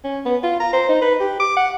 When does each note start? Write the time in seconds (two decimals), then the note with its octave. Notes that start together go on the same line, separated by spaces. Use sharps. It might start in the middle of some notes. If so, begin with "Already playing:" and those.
0.04 C#4
0.25 B3
0.43 F4
0.60 A#5
0.73 C5
0.89 D#4
1.02 B4
1.20 G4
1.40 D6
1.57 F#5